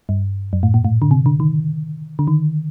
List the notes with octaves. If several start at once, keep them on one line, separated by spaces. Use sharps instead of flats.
G2
F#2
A2
A#2
A2
D3
C3
D3
D#3
D3
D#3